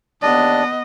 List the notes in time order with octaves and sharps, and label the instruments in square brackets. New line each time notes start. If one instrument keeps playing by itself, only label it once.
[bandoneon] D#2 D4 D5 [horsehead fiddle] B3 D#5